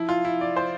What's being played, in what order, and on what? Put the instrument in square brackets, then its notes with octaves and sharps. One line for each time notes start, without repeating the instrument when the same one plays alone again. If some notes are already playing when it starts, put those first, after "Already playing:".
Already playing: [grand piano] F3 [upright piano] E4
[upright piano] F4
E4
D5
C5